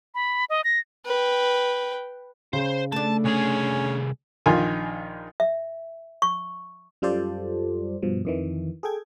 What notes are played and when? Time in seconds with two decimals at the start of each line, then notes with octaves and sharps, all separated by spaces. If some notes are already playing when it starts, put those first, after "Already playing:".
0.15 B5
0.50 D#5
0.64 A#6
1.06 B4 G5
2.53 C#3 C5
2.92 A3 D4 A5
3.25 C2 C#4 G#4
4.46 A#1 D#3 F4 G#5
5.40 E5
6.22 C#6
7.02 F#2 G3 F4 A4 C5 D5
8.03 G2 B2 F3
8.25 F2 D#3 E3
8.83 G#4 A4 G5 G#6